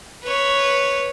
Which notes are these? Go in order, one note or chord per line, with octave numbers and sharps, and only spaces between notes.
B4 C#5